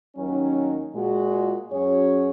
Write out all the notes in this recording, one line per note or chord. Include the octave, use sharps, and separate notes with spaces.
D#2 D#3 F#3 C#4
A#2 G#3 F#4
F#2 F#3 C#4 G#4 C#5